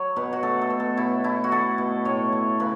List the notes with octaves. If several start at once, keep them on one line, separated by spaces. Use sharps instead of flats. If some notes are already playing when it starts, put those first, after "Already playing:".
Already playing: F#3 C#5
B2 B4
F#4
A3 A4
A4
B2
A4
B2 E4
A3 E4
F#4
A3 A4
B2
A2 C#5
A3
C#3 B4